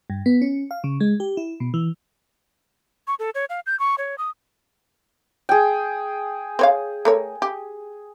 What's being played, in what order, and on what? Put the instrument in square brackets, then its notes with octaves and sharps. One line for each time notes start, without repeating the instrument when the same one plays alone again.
[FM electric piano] G2
B3
C#4
F5
C#3
G#3
G4
E4
B2
E3
[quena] C#6
A4
C#5
F5
G6
C#6
C#5
D#6
[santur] G#4 G5
[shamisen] C4 C#5 F5
A3 A#4 C#5
G4